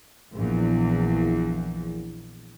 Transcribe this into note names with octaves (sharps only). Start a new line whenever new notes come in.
A#1 E2